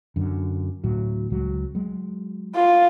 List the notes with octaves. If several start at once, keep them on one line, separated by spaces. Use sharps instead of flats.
F#2 D3
D2 A2 F#3
C#2 F#3 G#3
F#3 G#3
F4